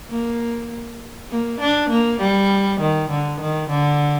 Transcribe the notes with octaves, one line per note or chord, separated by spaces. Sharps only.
A#3
A#3
D4
A#3
G3
D#3
D3
D#3
D3